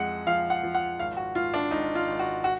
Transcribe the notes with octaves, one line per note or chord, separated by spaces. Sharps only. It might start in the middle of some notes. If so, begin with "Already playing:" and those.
Already playing: F2 G#3 F#5
F3 F5
F#5
F3
F#5
G#1 F5
F#4
G#1 F4
D4
G#1 D#4
F4
G#1
F#4
F#4